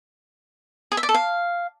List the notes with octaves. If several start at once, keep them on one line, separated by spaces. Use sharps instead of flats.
G#4
E5
D5
A4
F5